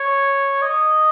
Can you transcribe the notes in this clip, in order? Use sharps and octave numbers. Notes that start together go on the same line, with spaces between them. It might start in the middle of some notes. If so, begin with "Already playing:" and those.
Already playing: C#5
D#5